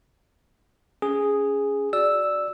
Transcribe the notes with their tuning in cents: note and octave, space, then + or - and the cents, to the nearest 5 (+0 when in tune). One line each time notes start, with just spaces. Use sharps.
C#4 +15 G#4 -5
F#4 +0 D5 +0 E6 +0